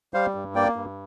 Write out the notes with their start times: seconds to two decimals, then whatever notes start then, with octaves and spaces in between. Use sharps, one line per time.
0.14 G3 C5 F5
0.35 G2
0.55 A#3 D5 G5
0.76 G2